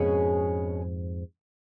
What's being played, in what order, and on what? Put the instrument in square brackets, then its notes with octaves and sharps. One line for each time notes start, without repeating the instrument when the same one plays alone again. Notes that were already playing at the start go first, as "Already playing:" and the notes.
Already playing: [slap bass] F2 G#2 [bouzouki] B2 G#3 C#4 G#4